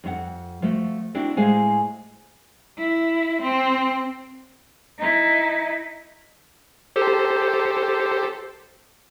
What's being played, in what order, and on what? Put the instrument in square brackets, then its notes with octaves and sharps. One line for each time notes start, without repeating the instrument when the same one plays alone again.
[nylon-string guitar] F2 F4 F#5
F3 A3 F#4
C4 D4 E4 F#4
A2 G#3 G#4 C5 F5 G#5
[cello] E4
C4
D#4 E4
[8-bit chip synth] G4 A4 C5